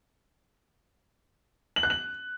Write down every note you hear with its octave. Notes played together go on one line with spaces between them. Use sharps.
F#7
F#6
F#7